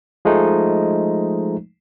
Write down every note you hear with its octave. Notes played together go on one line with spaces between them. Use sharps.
F3 G#3 A3 D#4